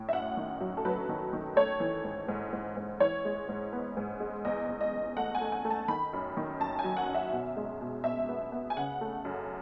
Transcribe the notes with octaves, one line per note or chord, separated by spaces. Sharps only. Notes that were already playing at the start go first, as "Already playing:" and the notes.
Already playing: A2
E5
F#2 F#5
D#3
F#3
A4
F#3 B4
D#3
D#3
A3 C#5
E3
G#2
G#2
G#2
G#2
E3 C#5
G#3
G#2
B3
G#2
G#3
E2 D#5
E2
D#5
E2
A3 F#5
G#5
A3
G#5
A3
A5
D#3 B5
F#2
D#3
F#2 A5
G#5
F#3
F#5
F#2
E5
B2
G#3
B2
B2 E5
B3
B3
G#5
C#3 F#5
A3
F#2